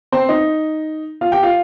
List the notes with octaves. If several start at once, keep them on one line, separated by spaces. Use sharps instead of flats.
C4 C5
D#4 D#5
F4 F5
G4 G5
F4 F5